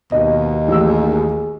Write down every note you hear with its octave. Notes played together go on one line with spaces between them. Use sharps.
D#2 B2 D#5
A1 G#4 E6